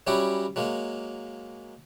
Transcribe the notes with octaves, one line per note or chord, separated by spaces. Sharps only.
F#3 G3 C#4 E4 F#4 G4
F#3 G#3 A#3